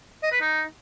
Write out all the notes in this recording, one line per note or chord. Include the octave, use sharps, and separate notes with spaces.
D#5
B4
D#4